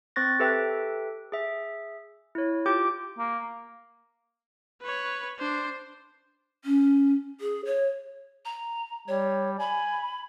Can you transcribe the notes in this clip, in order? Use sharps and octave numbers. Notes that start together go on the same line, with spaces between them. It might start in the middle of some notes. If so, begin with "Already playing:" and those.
C4 C5 C#6 F#6 A6 A#6
G4 A4 B4 E5 G5
G#4 E5
E4 C#5
F4 G4 G5 D6 G6 D7
A#3
B4 C#5
D4 C5
C#4
G#4
C#5
A#5
G3 C#5
G#5 B5